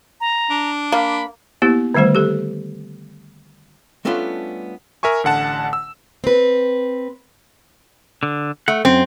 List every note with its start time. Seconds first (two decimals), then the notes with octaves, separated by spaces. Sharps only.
0.21 A#5
0.50 D4
0.92 A#3 B5
1.62 A#3 B3 E4 G4
1.94 D3 D#3 G3 A3 C5
2.15 G4 A4
4.05 G3 A3 B3 C#4 D4 F4
5.03 A#4 E5 G#5 C#6
5.24 A1 D3 F#5 A5
5.73 E6
6.24 C4 B4
8.23 D3
8.68 A3 F#5
8.85 F#2 C4